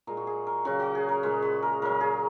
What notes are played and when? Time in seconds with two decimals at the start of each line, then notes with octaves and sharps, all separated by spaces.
0.07 A#2 G#3 A#4
0.17 F#4
0.27 G#4
0.47 A#4
0.65 C#3 F#3 F#4
0.80 F#4
0.95 G#4
1.09 A#4
1.23 A#2 G#3 B4
1.42 B4
1.63 A#4
1.82 A#2 F#3 A#4
2.01 G#4